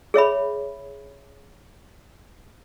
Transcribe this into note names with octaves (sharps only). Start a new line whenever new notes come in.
G#4 C#5 E5 B5